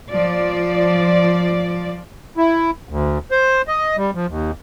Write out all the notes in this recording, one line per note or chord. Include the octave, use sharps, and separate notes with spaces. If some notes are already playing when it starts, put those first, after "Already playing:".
F3 D5
E4
D2
C5
D#5
G3
F3
D#2